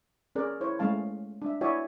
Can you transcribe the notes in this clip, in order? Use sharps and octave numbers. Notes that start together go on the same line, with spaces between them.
C#4 G#4 A#4 D5
E4 C5 C#5
G#3 A3 C#4 F5 A5
D4 E5
E4 F#4 C#5 D5 E5 G#5